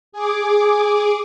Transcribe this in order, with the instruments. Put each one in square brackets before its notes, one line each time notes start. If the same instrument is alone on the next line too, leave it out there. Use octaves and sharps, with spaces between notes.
[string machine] G#4 D6